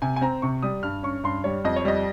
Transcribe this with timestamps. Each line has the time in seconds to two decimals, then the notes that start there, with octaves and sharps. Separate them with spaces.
0.02 C3 G#5
0.16 G#5
0.21 C4 A#5
0.42 C3 C#6
0.62 G3 D#6
0.83 G2 F6
1.03 C#4 C#6
1.24 G2 C6
1.44 G3 C#5
1.64 F2 D#5
1.76 C#5
1.85 G3 D#5